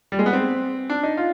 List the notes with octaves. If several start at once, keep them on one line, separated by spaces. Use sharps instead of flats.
G3
G#3
B3
C4
D4
D#4
F4